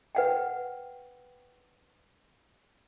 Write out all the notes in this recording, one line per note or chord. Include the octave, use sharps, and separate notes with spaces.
B4 F#5 G5